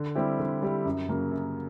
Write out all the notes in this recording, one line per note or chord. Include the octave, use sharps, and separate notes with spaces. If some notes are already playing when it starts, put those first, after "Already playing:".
Already playing: D3
G3 C4 E4 G4
D3
G3 C4 E4 G4
F#2
C#3 F#3 A#3
F#2